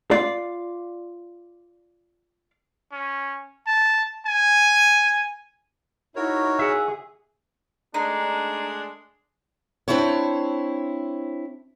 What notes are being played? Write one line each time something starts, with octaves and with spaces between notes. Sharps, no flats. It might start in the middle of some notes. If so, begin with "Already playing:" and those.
F4 D5
C#4
A5
G#5
D#4 E4 F#4 A#4 C#5
G#4 E5 F#5
G#3 A3 D4 D#4
C4 D4 E4 C5 C#5